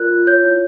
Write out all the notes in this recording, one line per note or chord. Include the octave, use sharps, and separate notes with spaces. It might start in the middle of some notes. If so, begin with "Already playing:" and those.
Already playing: F4 A#4 D5 F#6
F4
C#5 G6
E4